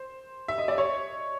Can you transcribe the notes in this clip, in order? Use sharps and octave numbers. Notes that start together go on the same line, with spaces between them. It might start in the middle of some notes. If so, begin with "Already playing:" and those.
Already playing: C5
E5
D#5
D5
C#5